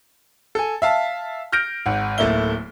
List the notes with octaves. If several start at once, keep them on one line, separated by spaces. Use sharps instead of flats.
A4 G#5
E5 F5 A5
F6 G6 A#6 D7
G#1 F#5
D1 A3 A#3 E4 G7